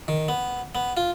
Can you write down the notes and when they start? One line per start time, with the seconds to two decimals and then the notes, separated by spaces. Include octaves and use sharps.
0.08 D#3
0.28 B3
0.75 B3
0.97 F4